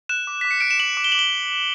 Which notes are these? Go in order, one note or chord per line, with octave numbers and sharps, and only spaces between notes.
F#6 E7
D6
D6 B6
C#7
F#6 D7
E7
D6 F#7
D6
G7
F#7
D6 G7